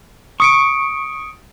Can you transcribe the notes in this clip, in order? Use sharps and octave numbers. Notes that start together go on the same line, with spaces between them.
C#6 D#6 C#7 D7